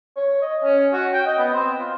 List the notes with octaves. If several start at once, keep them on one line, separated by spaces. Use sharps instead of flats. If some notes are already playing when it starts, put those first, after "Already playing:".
C#5
D#5
C#4
F#4
G5
D#5
B3
C4
F4